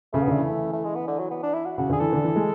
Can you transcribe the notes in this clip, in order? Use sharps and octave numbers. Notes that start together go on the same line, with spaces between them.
C#3 A3
B3
D3
A3
E3
A3
G#3
B3
D3
F#3
B3
D4
E4
F#4
C#3 F#4
D3 G#4
E3 A4
D3
E3
G#3